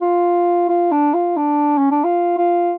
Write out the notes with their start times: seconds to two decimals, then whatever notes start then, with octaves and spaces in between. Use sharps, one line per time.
0.01 F4
0.69 F4
0.91 D4
1.14 F4
1.37 D4
1.78 C#4
1.91 D4
2.04 F4
2.38 F4